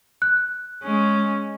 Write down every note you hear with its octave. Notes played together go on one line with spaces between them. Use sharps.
F#6
G#3 C#4